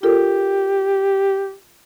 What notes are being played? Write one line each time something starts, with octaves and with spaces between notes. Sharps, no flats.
F4 G4 A4 A#4